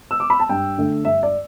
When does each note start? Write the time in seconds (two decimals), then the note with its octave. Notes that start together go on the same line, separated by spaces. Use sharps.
0.11 E6
0.20 D6
0.30 B5
0.40 A5
0.49 G2 G5
0.78 D3 A3 D4
1.04 G2 E5
1.23 D5